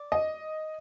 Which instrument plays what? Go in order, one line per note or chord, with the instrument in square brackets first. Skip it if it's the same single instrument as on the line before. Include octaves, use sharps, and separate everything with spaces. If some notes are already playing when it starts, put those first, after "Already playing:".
Already playing: [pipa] D5
[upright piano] D#5